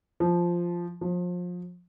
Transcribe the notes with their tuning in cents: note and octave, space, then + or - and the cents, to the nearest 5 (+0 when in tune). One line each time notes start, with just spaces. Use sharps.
F3 -5
F3 +30